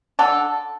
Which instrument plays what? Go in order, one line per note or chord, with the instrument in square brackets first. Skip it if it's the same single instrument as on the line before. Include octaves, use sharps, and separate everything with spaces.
[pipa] D3 A4